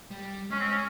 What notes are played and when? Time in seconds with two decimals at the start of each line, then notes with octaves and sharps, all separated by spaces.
0.11 G3
0.50 G#3 C#4
0.60 C4
0.70 C#4